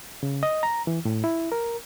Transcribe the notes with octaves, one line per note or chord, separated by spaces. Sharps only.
C#3
D#5
A#5
E3
A2
E4
A#4